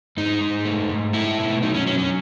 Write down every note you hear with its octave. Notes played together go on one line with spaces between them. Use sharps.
G#2 D#4
G#2
A3
G#2
A3 E4
B2
F#3 D#4
C#4
F#3 C#4
C#4